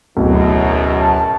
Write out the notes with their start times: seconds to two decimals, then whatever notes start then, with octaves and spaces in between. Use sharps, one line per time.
0.17 D1 B1 F#2 B2
1.01 A5